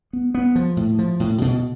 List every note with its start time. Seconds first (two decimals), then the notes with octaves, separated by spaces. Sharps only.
0.13 B3
0.35 B3
0.56 F3
0.77 A2
0.99 F3
1.20 A2
1.41 B2